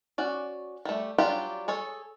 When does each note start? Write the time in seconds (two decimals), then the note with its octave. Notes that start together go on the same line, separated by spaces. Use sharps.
0.18 C#4 F#4 D5
0.85 G3 A3
1.18 F#3 G3 D4 F4 G4
1.68 G#4 A4 C#5